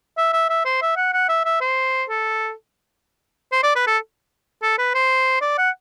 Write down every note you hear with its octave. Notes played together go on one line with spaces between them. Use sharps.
E5
E5
E5
C5
E5
F#5
F#5
E5
E5
C5
A4
C5
D5
B4
A4
A4
B4
C5
D5
F#5